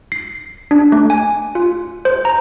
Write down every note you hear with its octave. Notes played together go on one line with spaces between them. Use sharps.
C7
D4
A3
G#5
F4
C5
A#5